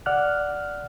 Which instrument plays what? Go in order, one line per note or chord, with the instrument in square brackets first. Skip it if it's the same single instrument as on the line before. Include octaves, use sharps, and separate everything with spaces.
[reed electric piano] D5 F#5 F6 F#6